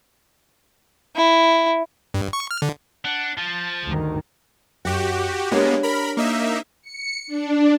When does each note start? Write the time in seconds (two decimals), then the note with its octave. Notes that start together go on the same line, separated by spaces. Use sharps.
1.16 E4
2.14 G2
2.33 C#6
2.51 F6
2.62 D3
3.05 D4 F#5
3.38 F3 A5
3.85 D2 G2 D#3
4.85 F#2 F#4 G4 G5
5.51 G#3 A#3 B3 D4 G4 C#5
5.83 A#4 B5
6.17 A#3 D#4 E5
6.82 C#7
7.27 D4